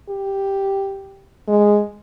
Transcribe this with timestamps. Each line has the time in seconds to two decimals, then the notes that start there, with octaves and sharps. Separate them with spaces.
0.09 G4
1.48 G#3